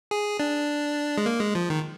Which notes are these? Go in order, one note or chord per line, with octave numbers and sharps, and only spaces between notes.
G#4
D4
G#3
A#3
G#3
F3
D#3